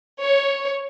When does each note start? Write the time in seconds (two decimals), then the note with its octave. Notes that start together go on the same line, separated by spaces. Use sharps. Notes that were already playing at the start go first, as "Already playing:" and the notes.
0.19 C#5